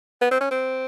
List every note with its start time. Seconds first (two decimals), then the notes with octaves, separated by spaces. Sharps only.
0.21 B3
0.31 C4
0.41 C#4
0.51 C4